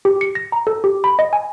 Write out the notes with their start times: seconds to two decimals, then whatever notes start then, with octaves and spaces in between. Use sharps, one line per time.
0.05 G4
0.21 C#7
0.35 A#6
0.52 A#5
0.67 A4
0.84 G4
1.04 B5
1.19 D#5
1.33 G#5